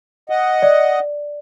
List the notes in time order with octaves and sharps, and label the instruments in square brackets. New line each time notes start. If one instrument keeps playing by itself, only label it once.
[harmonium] D#5 F#5
[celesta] D5